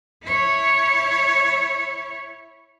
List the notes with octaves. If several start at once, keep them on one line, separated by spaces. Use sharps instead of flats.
E4 C#5